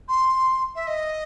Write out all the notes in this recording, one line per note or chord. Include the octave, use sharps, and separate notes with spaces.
C6
E5
D#5